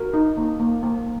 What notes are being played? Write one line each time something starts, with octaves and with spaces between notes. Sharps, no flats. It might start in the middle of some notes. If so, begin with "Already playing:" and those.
Already playing: F#4 A#4
D#4
A#3
A#3
A#3